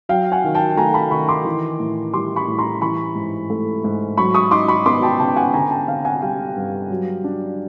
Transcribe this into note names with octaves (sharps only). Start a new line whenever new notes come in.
F#3 F5 G5
F#5 G#5
D#3
G5 A5
A3 G#5 A#5
A5 B5
D#3 B5 C#6
C6 D6
E3
A2
G3 C6 D6
B5 C#6
A2
A#5 C6
E3 B5 C#6
G#2
A3
G#2
F#3 B5 C#6
C#6 D#6
D#4 C6 D6
B5 C#6
B3 C6 D6
G5 A5
C#3 G5 A5
F#5 G#5
D3 G#5 A#5
G5 A5
C4 F5 G5
F#5 G#5
G3 F5 G5
G2
F#3
D4